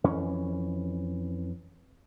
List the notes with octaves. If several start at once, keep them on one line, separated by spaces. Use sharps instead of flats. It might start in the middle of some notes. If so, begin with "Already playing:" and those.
F2 E3 C#4